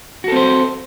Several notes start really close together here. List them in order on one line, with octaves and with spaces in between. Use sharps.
F#4 A4 C4 C5